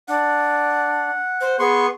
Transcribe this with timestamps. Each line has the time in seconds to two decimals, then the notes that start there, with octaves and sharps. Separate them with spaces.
0.08 D4 F#5
1.41 C5
1.59 B3 G#4 C6 C#6